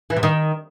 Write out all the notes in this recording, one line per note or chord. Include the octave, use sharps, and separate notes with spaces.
E3
C3
D#3